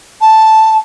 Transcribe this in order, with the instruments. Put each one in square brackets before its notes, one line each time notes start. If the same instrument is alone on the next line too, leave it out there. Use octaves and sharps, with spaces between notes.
[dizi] A5